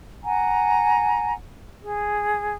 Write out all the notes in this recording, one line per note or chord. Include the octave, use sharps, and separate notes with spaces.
F#5 G#5 A#5
G#4